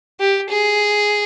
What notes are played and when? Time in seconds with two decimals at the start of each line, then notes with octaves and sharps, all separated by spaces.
0.20 G4
0.49 G#4